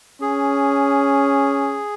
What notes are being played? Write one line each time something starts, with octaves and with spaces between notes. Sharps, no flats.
C#4 G#4